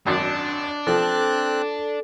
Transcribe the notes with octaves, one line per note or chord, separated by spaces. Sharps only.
G#1 F#2 D4
F3 C4 A4 F#6